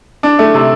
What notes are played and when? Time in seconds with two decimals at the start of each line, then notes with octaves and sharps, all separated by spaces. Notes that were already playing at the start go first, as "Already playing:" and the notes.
0.23 D4
0.39 A3
0.54 C3